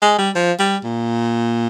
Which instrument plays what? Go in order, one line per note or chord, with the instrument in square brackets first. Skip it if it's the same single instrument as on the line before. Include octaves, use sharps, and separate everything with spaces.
[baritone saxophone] G#3
G3
F3
G3
A#2